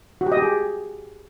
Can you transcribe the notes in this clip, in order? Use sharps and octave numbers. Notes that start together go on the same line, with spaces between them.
F#4
G4
D#5
G4
G#4